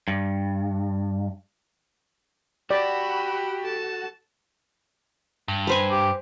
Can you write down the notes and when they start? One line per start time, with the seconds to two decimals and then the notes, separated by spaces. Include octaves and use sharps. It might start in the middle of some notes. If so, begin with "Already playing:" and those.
0.08 G2
2.71 F#4 G4 D5 B5 E6
3.62 A4 A5
5.48 G2
5.67 B4 C5 G#5
5.91 G4